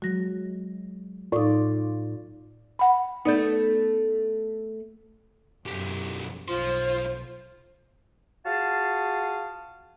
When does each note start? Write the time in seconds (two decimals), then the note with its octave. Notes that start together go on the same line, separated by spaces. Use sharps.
0.02 F#3 G#3 F#4 A#6
1.32 A2 D#4 F4 D5
2.79 F#5 B5
3.25 A3 B3 D#4 D5 G6
5.66 B1 F#2 G4
6.48 B1 F3 F4 C5 C6
8.46 F4 F#4 G#4 F5 A5